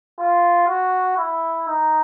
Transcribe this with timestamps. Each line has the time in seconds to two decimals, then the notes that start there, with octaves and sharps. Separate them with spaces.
0.20 F4
0.68 F#4
1.18 E4
1.68 D#4